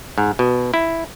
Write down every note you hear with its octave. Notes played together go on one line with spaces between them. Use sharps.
G#2
B2
E4